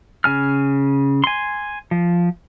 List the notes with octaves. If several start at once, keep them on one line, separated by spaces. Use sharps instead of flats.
C#3 G#5 F6
G#5 C6
F3